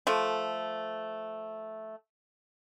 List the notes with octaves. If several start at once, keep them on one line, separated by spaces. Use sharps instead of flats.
F3 A3